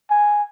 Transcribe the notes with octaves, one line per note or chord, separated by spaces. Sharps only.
G#5